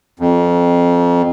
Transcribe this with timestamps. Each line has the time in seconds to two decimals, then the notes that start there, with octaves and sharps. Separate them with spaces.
0.20 F2